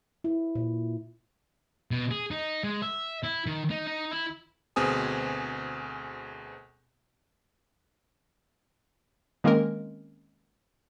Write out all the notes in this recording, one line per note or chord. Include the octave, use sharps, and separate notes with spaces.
E4
A#2
B2
G#4
D#4
G#3
E5
E4
D#3
D#4
D#4
E4
D2 B2 C4 G#4 G#5 D#6
D#3 G#3 A#3 C4 C#4 A#4